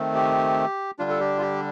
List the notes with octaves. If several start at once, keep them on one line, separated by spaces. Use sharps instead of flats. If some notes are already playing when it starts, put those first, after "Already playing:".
Already playing: D#3 A3 C4
G4
D3 G3 D4 F4
A4
G4
F4
G4